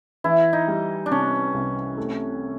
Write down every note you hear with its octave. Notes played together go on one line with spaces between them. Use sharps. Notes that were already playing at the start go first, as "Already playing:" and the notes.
E3 E4
D#4
G3
D4
C3 C#4
C2
A3